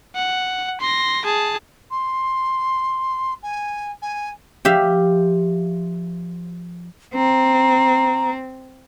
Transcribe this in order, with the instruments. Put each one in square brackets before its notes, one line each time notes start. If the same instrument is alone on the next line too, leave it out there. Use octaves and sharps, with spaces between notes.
[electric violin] F#5
C6 A#6
G#4 A5
[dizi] C6
G#5
G#5
[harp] F3 [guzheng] G4 E5 F5
[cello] C4 [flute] A#5